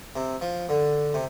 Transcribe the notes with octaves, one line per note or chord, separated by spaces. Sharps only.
C3
F3
D3
C3